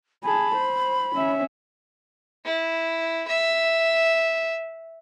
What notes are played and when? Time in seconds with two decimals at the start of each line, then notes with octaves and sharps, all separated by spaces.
0.24 G#4 A5 B5
0.55 C5
1.15 C#4 E5
2.45 E4
3.28 E5